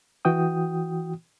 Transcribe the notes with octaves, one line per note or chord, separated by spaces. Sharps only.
E3 F#4 G5 D#6